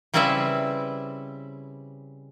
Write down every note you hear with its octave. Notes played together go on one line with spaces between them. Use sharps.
C#3 G3 C4 E4 B4 E5